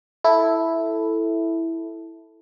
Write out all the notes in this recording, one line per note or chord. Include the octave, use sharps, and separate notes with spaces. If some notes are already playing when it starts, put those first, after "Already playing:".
E4 A4